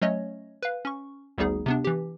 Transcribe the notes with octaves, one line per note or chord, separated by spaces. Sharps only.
F#3 A3 C#4 C#5 D#5
B4 F5
C#4 C#6
G#1 D2 G3 B3 D#4 G#4
C3 B3 D4
E3 G4